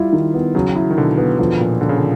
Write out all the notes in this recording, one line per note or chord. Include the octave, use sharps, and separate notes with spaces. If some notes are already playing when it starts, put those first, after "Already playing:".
Already playing: G3 E4 F4
D#3
B3
C#3 F#3
E4
D#3
B2 D3
B3
D3 F3
A#2
A#2 D3
C#3
D3